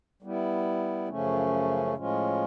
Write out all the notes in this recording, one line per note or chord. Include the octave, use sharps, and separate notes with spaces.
G3 B3 E4
F#2 C#3 F3 A3 C#4
A2 F3 G#3 C#4 F4